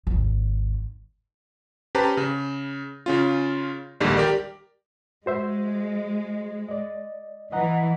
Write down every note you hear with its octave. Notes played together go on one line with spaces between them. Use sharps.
G#1 D#2
C#4 G4 B4 C5 A5 A#5
C#3
C#3 C#4 F4
A#1 D#2 D3 D#3 G3 G#3
G4 A#4 D5
G#3 F#4 C5 E5
D5 D#5
E3 D#5 F#5 A#5